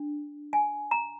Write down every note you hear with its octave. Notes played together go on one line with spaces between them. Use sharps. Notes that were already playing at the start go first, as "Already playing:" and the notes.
Already playing: D4
G#5
A#5